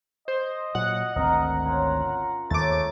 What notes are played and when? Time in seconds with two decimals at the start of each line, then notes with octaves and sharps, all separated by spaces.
0.28 C5 D#5
0.75 A#2 F#3 F#5
1.16 G#1 D2 C4 A#4 D#5
1.65 C#4 F4 G#5 A#5
2.51 D#2 G#2 A3 C#5 D6 A6